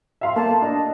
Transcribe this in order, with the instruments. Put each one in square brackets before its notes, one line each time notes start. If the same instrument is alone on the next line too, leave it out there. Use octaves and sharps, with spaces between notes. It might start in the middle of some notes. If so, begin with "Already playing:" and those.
[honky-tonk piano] E5 F5 C6
[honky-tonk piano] A3 A#3 [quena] A5
[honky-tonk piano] D4 [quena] D#5